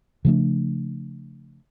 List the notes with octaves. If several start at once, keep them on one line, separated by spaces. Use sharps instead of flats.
C#3 F3 A3 D4